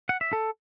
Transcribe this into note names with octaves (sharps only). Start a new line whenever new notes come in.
F#5
E5
A4